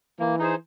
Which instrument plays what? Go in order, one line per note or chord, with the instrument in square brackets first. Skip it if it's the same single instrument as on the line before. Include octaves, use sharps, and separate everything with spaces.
[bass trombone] E3 [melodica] A#3
[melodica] D#4 G#4 C5